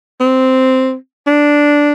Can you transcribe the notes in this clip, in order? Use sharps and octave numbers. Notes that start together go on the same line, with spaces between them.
C4
D4